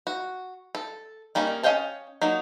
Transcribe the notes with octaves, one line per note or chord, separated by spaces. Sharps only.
F#4
A4
G3 A#3 C#4 D#4
C#4 D#5 F5 G5 A5
F#3 A#3 D#4